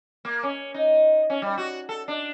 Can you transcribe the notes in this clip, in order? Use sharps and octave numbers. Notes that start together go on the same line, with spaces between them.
A#3
C#4
D#4
C#4
G3
F#4
A4
D4